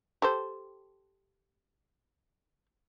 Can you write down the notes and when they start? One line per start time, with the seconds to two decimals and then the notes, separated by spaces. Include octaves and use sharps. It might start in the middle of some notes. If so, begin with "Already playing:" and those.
0.22 G4 A4 C5